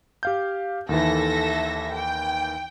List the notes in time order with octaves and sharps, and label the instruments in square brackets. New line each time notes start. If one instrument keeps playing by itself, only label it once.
[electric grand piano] G4 F5 G6
[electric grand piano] D#2 D#3 E3 [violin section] A4 E5 A#6
[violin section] G5